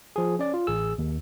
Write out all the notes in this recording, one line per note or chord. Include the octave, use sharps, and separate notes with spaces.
F3 G#4
C#4 D5
F4
A1 G#4 E6
D#2